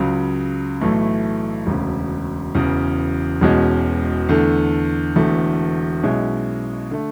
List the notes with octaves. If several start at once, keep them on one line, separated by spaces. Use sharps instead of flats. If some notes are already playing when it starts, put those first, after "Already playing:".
Already playing: C#2 C#3 F#3
B1 A2 E3 A3 E4
E1 D2 C#3
E1 E2 C#3
E1 E2 B2 G#3 C#4
E2 D3 A3
E1 E2 D3 A3
B1 B2 G#3 C#4 E4
D3 A3